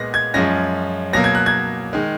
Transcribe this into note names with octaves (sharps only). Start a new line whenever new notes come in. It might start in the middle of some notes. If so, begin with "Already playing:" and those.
Already playing: A#2 G#3 B3 A#6
G#6
F#2 F3 G#3 C#4 A#6
B2 F#3 A#3 A#6
G#6
F#6
G#6
D#3 G#3